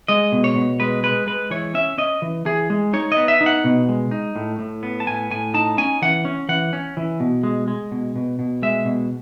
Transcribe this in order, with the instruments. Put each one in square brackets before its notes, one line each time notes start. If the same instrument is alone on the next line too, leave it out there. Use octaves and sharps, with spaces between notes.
[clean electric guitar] G#3 D#5
B2
C#5
B2
G#3 B4
G#3 B4
G#3 B4
E3 C#5
C#4 E5
C#4 D#5
E3
E3 G#4
G#3
D#4 C#5
B3 D#5
E5
D#4
F#5
B2
G#3
D#4
A2
A2
B3
A5
A2 G#5
A2 G#5
D#4 A5
C#4 G#5
E3 F#5
C#4
E3 F#5
C#4
E3
B2
G#3
G#3
B2
B2
B2
G#3 E5
B2